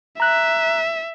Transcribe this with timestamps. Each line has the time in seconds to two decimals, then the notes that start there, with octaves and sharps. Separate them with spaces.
0.20 E5 A#5 F#6